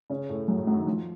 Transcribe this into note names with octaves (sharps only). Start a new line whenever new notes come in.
C#3 C#4
A2 A3
F#2 F#3
A2 A3
F#2 F#3
D#3
F3